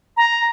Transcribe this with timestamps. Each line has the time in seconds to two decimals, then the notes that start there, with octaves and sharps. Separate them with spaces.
0.17 A#5